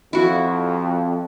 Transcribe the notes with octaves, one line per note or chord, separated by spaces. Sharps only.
F2 E4 F#4